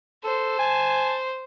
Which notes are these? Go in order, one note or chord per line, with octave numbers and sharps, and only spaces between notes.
A4 C5
G#5 A5